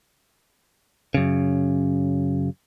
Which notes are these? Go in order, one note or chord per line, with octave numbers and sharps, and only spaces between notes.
F#2 C#3